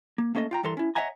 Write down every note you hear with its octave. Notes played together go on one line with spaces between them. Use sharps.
A#3
A3 A#3 C#4 A4 D#5
F4 G5 A#5
G2 E3 A4 A#4 C6
C#4 E4
C#5 D#5 E5 F#5 G#5 A#5